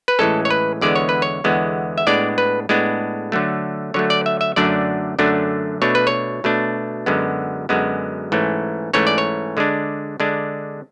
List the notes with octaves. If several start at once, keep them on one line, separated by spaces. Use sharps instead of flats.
B4
A2 E3 G#3 C#4 A4
C#5
B4
E2 D3 G#3 B3 D5
C#5
B4
C#5
E2 D3 G#3 B3
E5
A2 G#3 B3 D4 D5
B4
A2 G#3 B3 D4
D3 F#3 A3
D3 F#3 A3 C#5
D5
E5
E5
F#2 D3 F#3 A3 D4 D5
F#2 D3 F#3 A3 D4
B2 A3 D4 C#5
B4
C#5
B2 A3 D4
F#2 D3 G#3 B3
F#2 D3 G#3 B3
G#2 E3 A3 C#4
G#2 E3 A3 C#4 C#5
D5
C#5
D3 G#3 D4
D3 G#3 D4